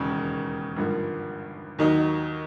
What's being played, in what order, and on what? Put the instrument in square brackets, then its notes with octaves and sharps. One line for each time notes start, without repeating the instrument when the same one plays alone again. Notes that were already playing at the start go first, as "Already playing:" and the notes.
Already playing: [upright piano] E1 D#2 C#3
G#1 G2 D3 F3 A#3
D#2 D#3 F#3 A#3 D#4